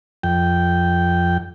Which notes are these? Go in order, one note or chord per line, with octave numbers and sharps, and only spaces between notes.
F2 G5